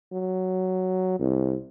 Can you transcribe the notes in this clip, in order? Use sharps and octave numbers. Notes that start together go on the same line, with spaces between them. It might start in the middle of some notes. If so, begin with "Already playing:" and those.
F#3
C2